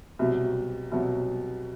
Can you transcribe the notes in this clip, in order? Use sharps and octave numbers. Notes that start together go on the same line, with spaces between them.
C2 B2 F#3
C2 B2 F#3